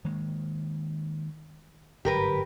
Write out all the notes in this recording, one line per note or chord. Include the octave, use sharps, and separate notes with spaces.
D#3 G#3 A#3
G1 G#2 F#3 G4 A#4 B4